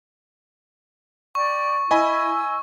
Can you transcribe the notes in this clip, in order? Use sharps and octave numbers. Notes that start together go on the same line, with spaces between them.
D5 G5 C#6
E4 D#5 G#5 B5 E6